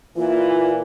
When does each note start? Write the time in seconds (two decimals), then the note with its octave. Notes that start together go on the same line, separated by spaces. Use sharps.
0.16 A#2 E3 F4